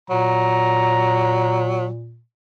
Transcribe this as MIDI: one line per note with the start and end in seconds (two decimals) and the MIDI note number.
0.10 2.21 46
0.10 1.87 54
0.10 1.62 82